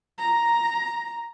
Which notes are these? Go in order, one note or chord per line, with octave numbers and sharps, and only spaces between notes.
A#5